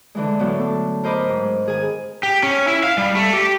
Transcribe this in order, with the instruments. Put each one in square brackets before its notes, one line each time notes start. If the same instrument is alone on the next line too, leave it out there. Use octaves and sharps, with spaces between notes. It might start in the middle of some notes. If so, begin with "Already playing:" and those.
[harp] D3 E3 G#3
A2 F#3 B3 D4
A4
A#4 C5 D#5 B5 D6
G#2
D#3 G#4 G#5
[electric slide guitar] G4
C#4
E4
F5
G3
A3
G4